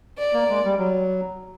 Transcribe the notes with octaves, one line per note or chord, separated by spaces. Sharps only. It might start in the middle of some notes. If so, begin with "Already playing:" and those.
D5
A#3
G#3
G3
F#3